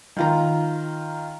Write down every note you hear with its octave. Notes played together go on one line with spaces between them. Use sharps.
D#3 F4 A#5